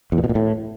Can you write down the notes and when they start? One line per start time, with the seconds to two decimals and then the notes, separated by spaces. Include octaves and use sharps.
0.12 E2
0.18 A#2
0.24 B2
0.29 A#2
0.35 A2